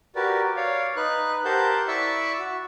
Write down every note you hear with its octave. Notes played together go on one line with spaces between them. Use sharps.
F#4 G4 A#4 B4 D5
C#5 D5 F5
D#4 B4 F#6
G4 A#4 C5 F#5 A5 G6
E4 D5 E5 B5 C#6 E6
F#4